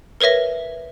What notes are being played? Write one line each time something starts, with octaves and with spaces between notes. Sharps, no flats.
A#4 B4 C#5 E5 A#6